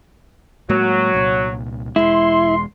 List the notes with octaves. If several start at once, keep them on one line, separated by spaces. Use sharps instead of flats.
A2 F#3 G#3 A#3
C2 A#2
E1 C2 G#3 E4 C6